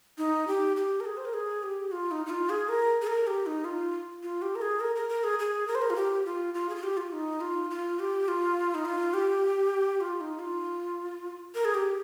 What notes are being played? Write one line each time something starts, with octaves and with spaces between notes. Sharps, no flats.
D#4
G4
G4
A#4
G#4
C5
A#4
G#4
G4
F4
D#4
D#4
F4
G#4
A#4
G#4
A#4
G4
D#4
F4
F4
G4
A#4
G#4
A#4
A#4
A#4
G#4
G#4
A#4
C5
A#4
F4
G4
F4
F4
G#4
F4
G4
F4
D#4
F4
F4
G4
F4
D#4
F4
G4
F4
D#4
F4
A#4
G#4
G4